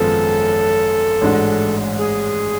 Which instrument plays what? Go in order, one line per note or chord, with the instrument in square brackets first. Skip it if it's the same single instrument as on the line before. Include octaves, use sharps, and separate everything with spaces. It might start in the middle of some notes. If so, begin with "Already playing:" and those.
Already playing: [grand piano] G#1 F#2 F3 G#3 B3 [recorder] A4
[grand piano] A1 G#2 G#3 D4 F#4
[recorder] G#4